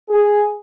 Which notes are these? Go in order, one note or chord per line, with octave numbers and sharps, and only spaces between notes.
G#4